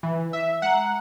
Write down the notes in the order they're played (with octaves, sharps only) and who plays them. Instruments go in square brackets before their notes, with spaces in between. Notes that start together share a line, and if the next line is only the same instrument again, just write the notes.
[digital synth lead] E3
E5
[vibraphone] G#3 A#5 [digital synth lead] F#5